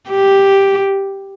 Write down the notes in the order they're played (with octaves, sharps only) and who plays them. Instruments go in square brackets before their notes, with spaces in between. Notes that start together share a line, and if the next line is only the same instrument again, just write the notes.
[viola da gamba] G4